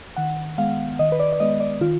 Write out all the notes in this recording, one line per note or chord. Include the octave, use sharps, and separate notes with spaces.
D#3 F#5
G#3 B3 F5
D#3 D#5
B4
D5
D5
G#3 B3 D#5
D5
D#3 F4